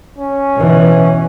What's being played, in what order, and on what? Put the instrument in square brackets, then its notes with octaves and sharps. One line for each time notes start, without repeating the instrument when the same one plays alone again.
[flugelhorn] C#4
[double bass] B2 E3